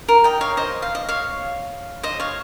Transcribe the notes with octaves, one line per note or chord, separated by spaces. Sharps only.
A#4
D#5 G5
C#5 F5
C5 D#5
F5
D#5
C#5 F5
C5 D#5
C#5 F5